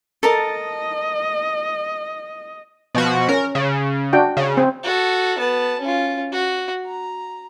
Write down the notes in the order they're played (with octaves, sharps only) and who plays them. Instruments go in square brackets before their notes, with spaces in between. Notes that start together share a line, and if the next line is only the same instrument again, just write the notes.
[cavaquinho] A4 A#4 A5 [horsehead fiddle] D#5
[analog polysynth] B2 F3 F#4
[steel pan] C#4 [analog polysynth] A#4
[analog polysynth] C#3
[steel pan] D4 F#4 G5
[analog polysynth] C#3
[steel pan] C4
[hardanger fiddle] F#4 A4
B3 A5
C#4 F4
F#4
A#5